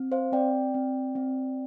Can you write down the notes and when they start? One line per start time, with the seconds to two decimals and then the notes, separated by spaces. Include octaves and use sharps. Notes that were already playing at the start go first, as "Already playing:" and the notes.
Already playing: C4
0.12 C5 F5
0.32 C4 D5 G5
0.74 C4
1.15 C4